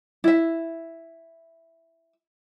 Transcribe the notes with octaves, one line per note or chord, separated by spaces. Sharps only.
E4 E5